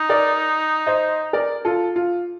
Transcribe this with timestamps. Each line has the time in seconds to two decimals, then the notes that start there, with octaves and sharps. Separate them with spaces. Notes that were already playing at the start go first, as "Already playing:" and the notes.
Already playing: D#4
0.10 A#4 D5
0.87 C5 D#5
1.33 A#4 D5
1.65 F4 A4
1.96 F4